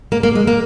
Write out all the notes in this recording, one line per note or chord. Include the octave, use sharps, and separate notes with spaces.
A#3
A#3
G#3
A#3